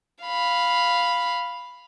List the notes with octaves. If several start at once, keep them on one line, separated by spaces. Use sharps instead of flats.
F5 B5